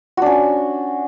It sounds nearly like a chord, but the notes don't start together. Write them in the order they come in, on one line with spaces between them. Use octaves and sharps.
F#4 D4 C#4